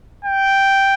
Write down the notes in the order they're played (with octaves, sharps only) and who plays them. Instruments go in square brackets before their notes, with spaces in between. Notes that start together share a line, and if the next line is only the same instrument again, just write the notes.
[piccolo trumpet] G5